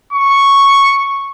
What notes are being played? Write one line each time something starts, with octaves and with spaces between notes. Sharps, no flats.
C#6